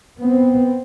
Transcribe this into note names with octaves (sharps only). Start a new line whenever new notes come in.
B3 C4